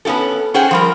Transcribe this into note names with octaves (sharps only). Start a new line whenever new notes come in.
B3 C#4 E4 G4 A4
C#4 G#4 C5 F#5 G5
F3 G3 A#4